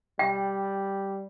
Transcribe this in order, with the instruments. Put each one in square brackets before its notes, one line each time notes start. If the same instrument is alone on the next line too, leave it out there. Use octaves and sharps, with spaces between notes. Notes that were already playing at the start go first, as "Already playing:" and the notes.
[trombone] G3 [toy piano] G5